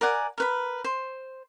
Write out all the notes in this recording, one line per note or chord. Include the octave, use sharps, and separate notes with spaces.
A#4 D5 F#5 G#5
A#4 B4 B5
C5